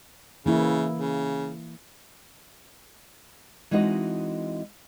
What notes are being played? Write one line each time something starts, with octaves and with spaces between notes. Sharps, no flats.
C#3 E3 A#3 E4
C#3
E3 G#3 C4 D#4 F#4 D#5